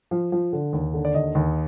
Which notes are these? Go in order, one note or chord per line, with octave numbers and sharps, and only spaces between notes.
F3
F3
D3
D#2
D3
D5
D#2 D#5
D#2